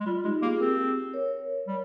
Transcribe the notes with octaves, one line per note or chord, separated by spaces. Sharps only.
G#3
G3 F4
G#3 D#4 G4
A#3 F4 G#4
G#4
C4 G4 A#4
A#4 C#5
G3